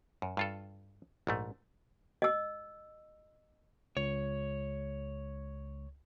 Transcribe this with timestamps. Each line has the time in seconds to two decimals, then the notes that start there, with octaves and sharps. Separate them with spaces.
0.22 F#2
0.37 G2 F4 A4
1.27 A#1 G#2 A3
2.22 D#5 E6
3.97 C#2 C#5